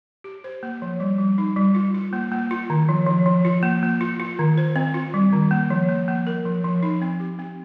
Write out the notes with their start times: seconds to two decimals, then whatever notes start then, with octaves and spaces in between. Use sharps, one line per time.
0.24 G4
0.44 C5
0.63 A#3
0.82 F3
1.00 G3
1.18 G3
1.38 D#4
1.56 G3
1.75 F4
1.94 F4
2.13 A#3
2.32 A#3
2.51 F4
2.70 D#3
2.89 F3
3.06 F3
3.26 F3
3.45 F4
3.63 A#3
3.83 A#3
4.01 F4
4.20 F4
4.39 D#3
4.58 C5
4.76 C4
4.94 F4
5.14 G3
5.33 D#3
5.51 A#3
5.70 F3
5.89 A#3
6.08 A#3
6.27 A#4
6.45 F3
6.64 F3
6.83 D#4
7.02 C4
7.20 G4
7.39 C4